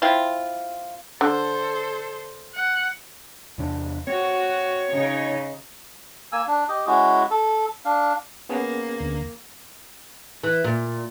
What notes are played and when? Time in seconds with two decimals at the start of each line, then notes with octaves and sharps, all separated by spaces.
0.02 C4 E4 F4
1.21 D3 A4 C5
2.54 F#5
3.58 E2 C3 D4
4.07 C4 F#4 C#5
4.90 C#3 D#4
6.32 A#3 G#5 E6
6.47 D4
6.69 G4 D#5
6.87 G#3 C#4 E4 F#4
7.31 A4
7.85 D4 F5
8.49 A#3 B3 C#4 G#4
9.00 D2 D3
10.43 E3
10.64 A#2